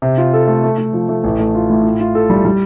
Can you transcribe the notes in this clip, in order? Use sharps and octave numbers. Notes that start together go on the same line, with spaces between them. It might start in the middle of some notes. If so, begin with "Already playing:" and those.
C3
F4
A4
A3
A3
A3
F3
A3
A1
A3
F4
A2
F4
F4
A4
G3
G3